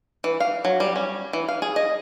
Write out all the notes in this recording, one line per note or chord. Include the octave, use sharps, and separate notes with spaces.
E3
F5
F#3
G3
C#4
E3
F5
G#4
D#5